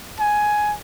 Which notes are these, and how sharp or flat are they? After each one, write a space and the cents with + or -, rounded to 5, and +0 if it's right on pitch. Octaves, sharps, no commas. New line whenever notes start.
G#5 +10